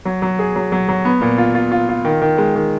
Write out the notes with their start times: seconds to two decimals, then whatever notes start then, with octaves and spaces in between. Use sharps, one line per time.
0.05 F#3
0.22 F#3
0.39 G#4
0.56 F#3
0.72 F#3
0.89 F#3
1.05 B3
1.21 A#2
1.38 F4
1.55 F4
1.72 F4
1.89 F4
2.05 D#3
2.22 D#3
2.38 G#3
2.55 D#3